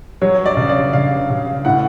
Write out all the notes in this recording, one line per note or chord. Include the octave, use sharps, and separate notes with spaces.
F#3 C#5
D5
C#3
D5
C#3 F5
C#3
A2 F#5